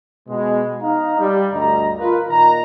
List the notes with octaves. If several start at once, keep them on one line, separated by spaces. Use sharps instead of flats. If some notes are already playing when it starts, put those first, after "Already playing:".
B2 G#3
D#4 F5 A#5
G3
D2 G2 G3 D#5 A#5
F4 A#4 B4
A#2 D#3 A#5